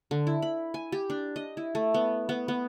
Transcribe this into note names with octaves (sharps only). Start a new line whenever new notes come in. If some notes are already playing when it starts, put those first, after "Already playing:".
D3
E4
B5
G#5
G4
D4
D#5
E4
A3
B3
B3
B3